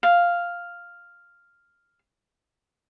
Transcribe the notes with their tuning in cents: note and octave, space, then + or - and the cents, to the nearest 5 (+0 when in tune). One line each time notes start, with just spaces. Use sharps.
F5 +0